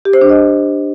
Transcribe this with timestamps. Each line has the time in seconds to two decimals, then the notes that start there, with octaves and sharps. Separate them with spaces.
0.05 G4
0.13 C5
0.21 D4
0.29 D#5